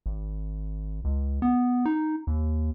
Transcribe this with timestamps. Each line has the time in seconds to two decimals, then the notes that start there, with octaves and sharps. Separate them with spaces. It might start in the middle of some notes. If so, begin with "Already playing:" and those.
0.06 G#1
1.04 C#2
1.42 B3
1.85 D#4
2.27 D#2